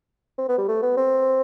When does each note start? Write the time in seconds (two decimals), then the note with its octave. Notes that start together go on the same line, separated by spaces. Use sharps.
0.38 C4
0.49 B3
0.58 G3
0.68 A3
0.82 B3
0.97 C4